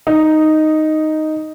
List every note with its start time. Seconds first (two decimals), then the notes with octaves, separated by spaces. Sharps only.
0.07 D#4